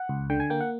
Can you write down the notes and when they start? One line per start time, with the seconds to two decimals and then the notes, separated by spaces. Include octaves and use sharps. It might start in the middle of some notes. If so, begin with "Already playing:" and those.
Already playing: F#5
0.09 C#2
0.30 D3 G5
0.40 G#5
0.50 A#3 G5
0.61 F#5